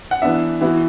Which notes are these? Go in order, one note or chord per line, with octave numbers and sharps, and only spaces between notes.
F#5
E3 B3 D4 E5
E3 B3 E4 F#4